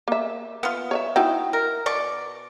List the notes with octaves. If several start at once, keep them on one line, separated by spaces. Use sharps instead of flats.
A#3 E5
B3 F4
C#5 D#5 E5
D#4 E4 F#4 G5
A#4
B2 D5 C#6